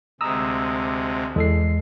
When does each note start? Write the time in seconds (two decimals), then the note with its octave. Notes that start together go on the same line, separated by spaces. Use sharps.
0.21 D2 C3 G#3 A#5 D#6 E6
1.36 E2 G#3 A4 C7